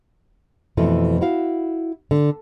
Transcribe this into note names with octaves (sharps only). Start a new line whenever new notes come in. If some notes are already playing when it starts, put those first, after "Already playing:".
F2 B2 E3 A3
E4 F#4 F5
D3